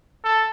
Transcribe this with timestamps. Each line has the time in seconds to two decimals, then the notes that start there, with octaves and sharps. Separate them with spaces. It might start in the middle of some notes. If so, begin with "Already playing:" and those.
0.24 A4